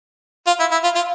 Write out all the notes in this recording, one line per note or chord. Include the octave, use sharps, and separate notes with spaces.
F4
E4
E4
F4
F4